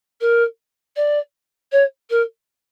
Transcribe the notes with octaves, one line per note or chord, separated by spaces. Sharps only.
A#4
D5
C#5
A#4